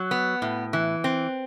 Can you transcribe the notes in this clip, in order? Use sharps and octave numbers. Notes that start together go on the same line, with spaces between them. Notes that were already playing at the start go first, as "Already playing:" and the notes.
Already playing: F#3
B3
A2
E3
C4